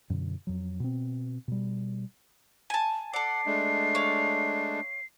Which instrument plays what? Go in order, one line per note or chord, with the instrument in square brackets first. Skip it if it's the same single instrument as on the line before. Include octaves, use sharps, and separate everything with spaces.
[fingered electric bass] F#2 B2 D3
F2 F#3
B2 C4
B2 G3
[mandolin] G#5 A5
[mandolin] A4 D5 [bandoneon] F#5 [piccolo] C7
[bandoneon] G#3 A3 D4
[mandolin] C#5 F5